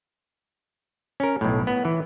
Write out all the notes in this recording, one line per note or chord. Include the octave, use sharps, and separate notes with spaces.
C#4 A#4
B1 A2
B3
E3